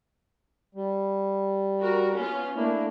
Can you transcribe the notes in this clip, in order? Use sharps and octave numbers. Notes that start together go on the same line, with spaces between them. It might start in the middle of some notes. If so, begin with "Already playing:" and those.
G3
F#4 A#4
B3 C#4 F4
A3 A#3 D4 E4